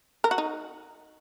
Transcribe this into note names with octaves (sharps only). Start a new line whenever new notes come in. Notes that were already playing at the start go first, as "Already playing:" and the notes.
A#4
F#4
D#4